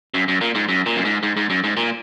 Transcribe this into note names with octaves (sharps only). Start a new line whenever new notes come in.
F#2
F#2
A#2
G#2
F#2
A#2
F#2
G#2
G#2
G#2
F#2
G#2
A#2